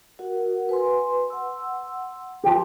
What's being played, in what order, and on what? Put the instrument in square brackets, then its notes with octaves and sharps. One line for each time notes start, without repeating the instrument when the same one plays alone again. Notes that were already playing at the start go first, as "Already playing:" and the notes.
[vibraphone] F#4 A#4 F#5
B4 G#5 C6
F#5 C6 E6
[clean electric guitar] F3 G4